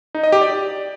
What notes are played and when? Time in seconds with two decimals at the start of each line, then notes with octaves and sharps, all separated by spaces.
0.15 D#4
0.23 D#5
0.32 G4
0.41 D5